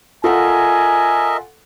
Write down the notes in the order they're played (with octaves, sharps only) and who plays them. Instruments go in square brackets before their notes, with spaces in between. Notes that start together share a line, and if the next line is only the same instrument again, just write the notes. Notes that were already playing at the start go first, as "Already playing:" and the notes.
[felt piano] F4 A4 F#5 [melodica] A#4 D#5 E5 [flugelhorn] G#5